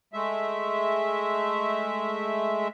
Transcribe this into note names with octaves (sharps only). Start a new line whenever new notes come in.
G#3 A3 E5